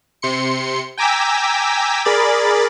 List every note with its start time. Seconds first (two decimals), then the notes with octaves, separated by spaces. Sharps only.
0.22 C3 C6 C#7
0.98 G5 G#5 A#5 D6 E6 B6
2.05 G#4 A#4 D5 B5 A6